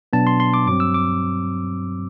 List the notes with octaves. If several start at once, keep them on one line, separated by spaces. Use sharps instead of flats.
B2 F#3 B3 D4 A5
C6
C6
D6
G2 F#3 C4 D6
E6
D6